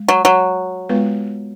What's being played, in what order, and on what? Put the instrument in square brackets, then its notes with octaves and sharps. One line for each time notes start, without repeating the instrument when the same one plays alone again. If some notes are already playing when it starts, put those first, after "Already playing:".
Already playing: [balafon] G#3
[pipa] F#3
F#3
[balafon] G#3 B3 F4 B4